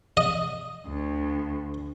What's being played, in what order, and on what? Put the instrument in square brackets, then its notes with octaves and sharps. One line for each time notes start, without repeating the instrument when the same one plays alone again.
[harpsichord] D#5
[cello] D2